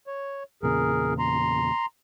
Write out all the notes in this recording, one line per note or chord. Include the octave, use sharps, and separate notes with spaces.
C#5
E2 A#2 C#3 G#4 A#4
A#5 C6